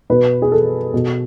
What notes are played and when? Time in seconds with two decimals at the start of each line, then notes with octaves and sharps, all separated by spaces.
0.10 B2 B4
0.42 G#4
0.52 A4
0.94 B2